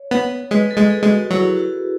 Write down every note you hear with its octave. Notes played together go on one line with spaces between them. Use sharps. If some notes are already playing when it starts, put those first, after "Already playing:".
Already playing: C#5
B3
G#3 B4
A4
G#3
G#4
G#3
F#4
F#3 E4
F#4